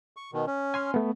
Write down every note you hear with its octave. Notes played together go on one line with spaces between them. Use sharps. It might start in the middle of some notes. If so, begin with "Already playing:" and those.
C#6
B2 D#3
C#4
G#5 C6 F6
A3 B3